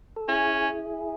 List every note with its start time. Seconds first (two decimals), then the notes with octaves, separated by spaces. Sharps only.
0.16 A4
0.28 C#4 E4 G#4